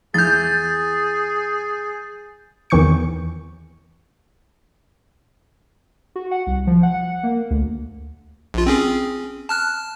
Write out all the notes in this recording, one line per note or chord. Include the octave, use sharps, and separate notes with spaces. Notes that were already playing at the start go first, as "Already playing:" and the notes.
E2 E3 G#4 G6 A6
E2 D#3 E3 C#6 G6 C#7
F#4
F#5
C2
F3
F#5
A#3
D2
A#1 F4
C4 C#4 G#4
A5 F6 F#6